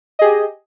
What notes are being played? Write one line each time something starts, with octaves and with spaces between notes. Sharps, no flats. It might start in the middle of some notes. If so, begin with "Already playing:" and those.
G4 G#4 D#5